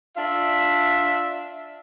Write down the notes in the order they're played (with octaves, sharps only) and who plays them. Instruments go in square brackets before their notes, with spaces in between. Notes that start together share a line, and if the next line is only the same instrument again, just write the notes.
[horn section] D4 F4 E5